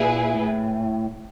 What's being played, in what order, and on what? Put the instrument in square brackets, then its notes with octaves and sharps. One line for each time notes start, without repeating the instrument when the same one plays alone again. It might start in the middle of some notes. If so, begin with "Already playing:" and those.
Already playing: [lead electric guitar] A#2 [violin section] E4 G#4 B4
[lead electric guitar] A2